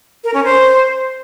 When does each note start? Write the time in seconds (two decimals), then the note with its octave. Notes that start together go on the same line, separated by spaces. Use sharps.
0.24 A#4
0.34 C#4
0.44 C5